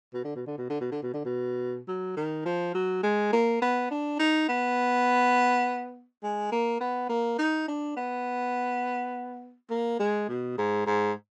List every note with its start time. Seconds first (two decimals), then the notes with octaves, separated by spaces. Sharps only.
0.14 B2
0.25 D3
0.36 B2
0.47 D3
0.58 B2
0.70 D3
0.81 B2
0.91 D3
1.03 B2
1.14 D3
1.25 B2
1.88 F#3
2.16 D#3
2.45 F3
2.74 F#3
3.03 G#3
3.33 A#3
3.62 B3
3.91 D4
4.19 D#4
4.49 B3
6.23 G#3
6.52 A#3
6.80 B3
7.09 A#3
7.39 D#4
7.68 D4
7.97 B3
9.71 A#3
9.99 G#3
10.29 B2
10.58 G#2
10.86 G#2